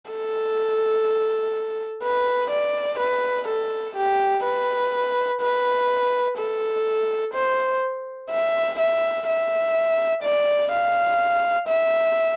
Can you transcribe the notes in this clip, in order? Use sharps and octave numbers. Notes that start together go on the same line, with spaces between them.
A4
B4
D5
B4
A4
G4
B4
B4
A4
C5
E5
E5
E5
D5
F5
E5